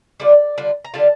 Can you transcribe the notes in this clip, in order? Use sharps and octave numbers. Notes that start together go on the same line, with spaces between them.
D3 G3 D4 F4 D5
D3 G3 D4 F4
A#5
D3 G3 D4 F4 A5